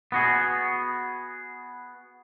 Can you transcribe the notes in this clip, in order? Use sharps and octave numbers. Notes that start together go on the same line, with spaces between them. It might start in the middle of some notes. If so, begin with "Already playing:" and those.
B3 F#4 G#4